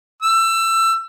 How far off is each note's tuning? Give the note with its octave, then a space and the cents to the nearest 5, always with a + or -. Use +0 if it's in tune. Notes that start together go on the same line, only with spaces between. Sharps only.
E6 +20